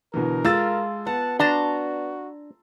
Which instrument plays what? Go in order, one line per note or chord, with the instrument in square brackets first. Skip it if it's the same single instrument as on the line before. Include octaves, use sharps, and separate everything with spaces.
[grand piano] B2 D3 E3 [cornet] A#4
[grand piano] G#3 E6 A6 [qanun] F4 A4
[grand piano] B3 [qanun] F#5 [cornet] A5
[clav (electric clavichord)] D4 [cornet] F#4 [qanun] A5 A#5 C6